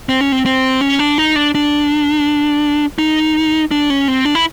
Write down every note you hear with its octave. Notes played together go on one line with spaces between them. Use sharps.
C4
C#4
C4
C4
C#4
D4
D#4
D4
D4
D#4
D4
C#4
C4
D4
E4